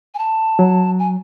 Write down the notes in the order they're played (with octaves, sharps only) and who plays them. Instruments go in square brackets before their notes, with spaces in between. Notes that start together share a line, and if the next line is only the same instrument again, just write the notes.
[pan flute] G#5
A5
[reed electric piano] F#3
[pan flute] G#5